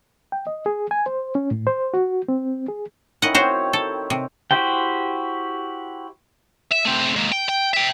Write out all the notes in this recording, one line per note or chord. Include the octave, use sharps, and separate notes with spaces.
G5
D#5
G#4
G#5
C5
C#4
A2
C5
F#4
C4
G#4
D#3 C#4 E4 D#5 F#5
C4 F#4 C5 C#5 G5
A4
C3
E4 F#4 G4 C5 G5
E5
A3 C4
G#3 A#3
G5
G5
E5 G5